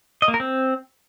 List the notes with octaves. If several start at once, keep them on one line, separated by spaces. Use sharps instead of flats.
D#5
A#3
A#4
C4